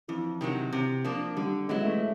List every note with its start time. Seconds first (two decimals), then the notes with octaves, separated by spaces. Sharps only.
0.08 F2 E3
0.41 C3 D#3 F#3
0.73 C3
1.05 F3 A#3 D4
1.37 D3 G3
1.69 F#3 G#3 B3 E4
1.85 A3